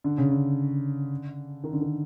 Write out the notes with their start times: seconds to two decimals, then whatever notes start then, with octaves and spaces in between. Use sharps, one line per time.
0.04 D3
0.18 C#3
0.32 D3
1.64 D#3
1.73 D3
1.81 D#3